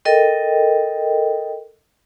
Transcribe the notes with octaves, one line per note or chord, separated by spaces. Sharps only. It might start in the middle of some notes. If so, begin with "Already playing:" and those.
A4 A#4 D#5 G5